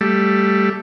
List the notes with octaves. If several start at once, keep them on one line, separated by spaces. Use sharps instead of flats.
G3 A3